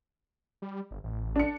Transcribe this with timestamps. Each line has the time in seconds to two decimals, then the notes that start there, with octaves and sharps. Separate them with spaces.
0.62 G3
0.91 G1
1.04 A1
1.36 D4 C#7